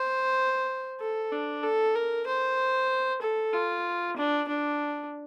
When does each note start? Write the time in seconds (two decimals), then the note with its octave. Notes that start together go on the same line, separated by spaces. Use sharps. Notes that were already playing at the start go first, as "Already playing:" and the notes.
Already playing: C5
1.00 A4
1.32 D4
1.63 A4
1.95 A#4
2.27 C5
3.22 A4
3.53 F4
4.17 D4
4.48 D4